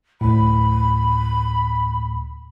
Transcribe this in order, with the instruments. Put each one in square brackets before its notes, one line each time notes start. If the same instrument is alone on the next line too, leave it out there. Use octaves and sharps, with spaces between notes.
[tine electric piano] D2 A2 [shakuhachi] B5